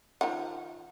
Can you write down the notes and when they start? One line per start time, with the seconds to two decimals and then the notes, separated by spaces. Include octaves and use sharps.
0.21 D#3 F3 F#5